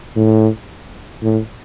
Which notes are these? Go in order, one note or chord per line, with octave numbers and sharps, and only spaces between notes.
A2
A2